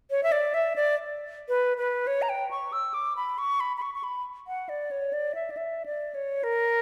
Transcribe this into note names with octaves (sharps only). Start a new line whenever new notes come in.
C#5
E5
D5
E5
D5
B4
B4
C#5
A#5
G5
C#6
E6
D6
B5
C#6
B5
B5
C#6
C#6
B5
F#5
D5
C#5
D5
E5
D5
E5
D5
C#5
A#4